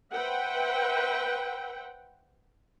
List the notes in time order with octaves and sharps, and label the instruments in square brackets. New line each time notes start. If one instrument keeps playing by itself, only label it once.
[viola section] B4 C5 E5 F#5 G5